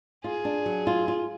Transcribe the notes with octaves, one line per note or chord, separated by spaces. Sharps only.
F4 G#4
D4
F#3
F4
F4